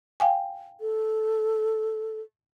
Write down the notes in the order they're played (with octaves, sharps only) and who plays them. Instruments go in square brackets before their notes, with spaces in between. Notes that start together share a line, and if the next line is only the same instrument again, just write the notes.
[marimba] F5 G5 G#5
[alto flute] A4